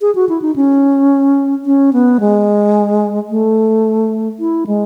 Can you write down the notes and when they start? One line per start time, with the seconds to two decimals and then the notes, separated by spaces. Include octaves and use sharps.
0.01 G#4
0.15 F#4
0.29 E4
0.42 D#4
0.56 C#4
1.66 C#4
1.93 B3
2.20 G#3
3.30 A3
4.39 E4
4.67 G#3